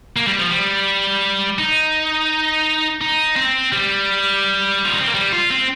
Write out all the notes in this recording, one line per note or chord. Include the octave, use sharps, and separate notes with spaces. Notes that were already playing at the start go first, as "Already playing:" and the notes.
A#3
G3
F3
G3
D#4
D#4
C4
G3
F4
D#4
C4
A#3
G3
F4
C4